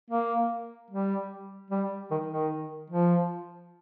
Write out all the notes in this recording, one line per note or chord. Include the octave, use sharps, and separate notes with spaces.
A#3
G3
G3
D#3
D#3
F3